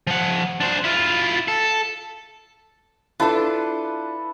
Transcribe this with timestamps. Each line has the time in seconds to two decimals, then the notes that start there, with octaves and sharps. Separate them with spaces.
0.07 F3 F#5
0.61 D4 C5
0.84 E4 F4
1.48 A4
3.20 D4 E4 F4 A4 B4 A5